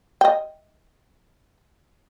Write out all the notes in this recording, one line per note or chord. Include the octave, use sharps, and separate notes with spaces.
D#5 G5